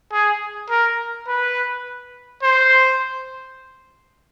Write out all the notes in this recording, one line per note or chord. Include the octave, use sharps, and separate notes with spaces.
G#4
A#4
B4
C5